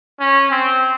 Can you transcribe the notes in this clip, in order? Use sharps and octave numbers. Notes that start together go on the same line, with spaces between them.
C#4
C4